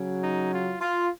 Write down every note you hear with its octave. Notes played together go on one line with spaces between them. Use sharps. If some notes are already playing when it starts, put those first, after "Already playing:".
Already playing: C#3 F#3
D#4
F4
F4